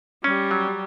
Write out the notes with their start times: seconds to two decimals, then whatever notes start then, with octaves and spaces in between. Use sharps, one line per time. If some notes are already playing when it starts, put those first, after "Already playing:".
0.24 G3 C#4
0.51 F#3